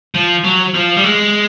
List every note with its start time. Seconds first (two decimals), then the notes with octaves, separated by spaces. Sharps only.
0.15 F3
0.44 F#3
0.74 F3
0.97 G3
1.04 G#3